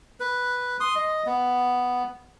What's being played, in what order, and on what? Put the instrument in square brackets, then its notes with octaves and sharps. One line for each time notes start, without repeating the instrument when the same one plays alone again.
[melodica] B4
C6 D#6
D#5
B3